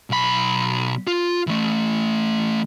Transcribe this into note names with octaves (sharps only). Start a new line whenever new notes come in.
B1 B5
F4
E3 A3